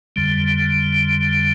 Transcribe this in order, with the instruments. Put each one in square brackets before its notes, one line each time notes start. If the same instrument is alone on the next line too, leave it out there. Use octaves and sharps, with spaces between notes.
[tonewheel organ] F2 D3 G3